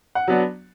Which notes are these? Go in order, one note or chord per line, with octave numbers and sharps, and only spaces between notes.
F#5
F#3 B3 D4